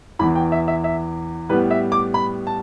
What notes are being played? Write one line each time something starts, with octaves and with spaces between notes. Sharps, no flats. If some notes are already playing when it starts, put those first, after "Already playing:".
E2 E3 B3 B5
G5
E5
E5
E5
A2 G3 B3 B4
E5
D6
B5
A5